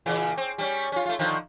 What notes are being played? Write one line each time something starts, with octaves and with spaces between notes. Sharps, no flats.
A#2 C#3 E3
C4
G3 C#4
C#4 F4
A3 F4
D3 D#3 F3